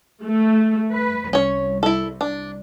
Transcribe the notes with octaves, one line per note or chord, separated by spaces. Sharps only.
A3
B4
C2 C#4 C#5
E4 A4
D4